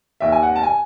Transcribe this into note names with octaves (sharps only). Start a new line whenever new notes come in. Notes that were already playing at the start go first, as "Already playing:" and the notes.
D#2 E5
G#5
F#5
A5
G#5